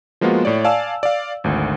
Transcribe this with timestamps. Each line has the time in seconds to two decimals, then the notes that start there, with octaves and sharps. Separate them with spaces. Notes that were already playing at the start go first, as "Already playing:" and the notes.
0.21 F3 G#3 A#3 B3 F4 F#4
0.45 A2 C#5 D5
0.64 D5 F5 G#5 A5 E6
1.03 D5 F5
1.44 G#1 D2